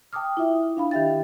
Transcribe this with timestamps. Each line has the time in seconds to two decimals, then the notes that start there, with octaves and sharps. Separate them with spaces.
0.13 G5 A5 D6 D#6 F6
0.37 E4 F4 E5 D#6
0.77 D4 F5 B5
0.91 D#3 G4 E5 G5 A6